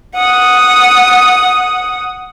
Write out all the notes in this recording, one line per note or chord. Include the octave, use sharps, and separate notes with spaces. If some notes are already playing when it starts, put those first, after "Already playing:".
F#5 D#6